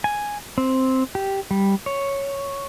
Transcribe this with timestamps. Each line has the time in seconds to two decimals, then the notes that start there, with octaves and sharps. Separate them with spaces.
0.04 G#5
0.58 C4
1.15 G4
1.51 G3
1.86 C#5